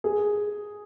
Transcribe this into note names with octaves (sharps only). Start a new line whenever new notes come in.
G#4